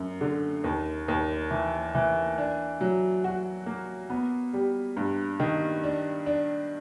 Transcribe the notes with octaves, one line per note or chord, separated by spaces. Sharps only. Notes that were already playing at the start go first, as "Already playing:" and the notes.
Already playing: F#2
D3
D#2
D#2
E3
E3
D4
F#3
F#4
A#3
B3
G3
G2
D#3
D4
D4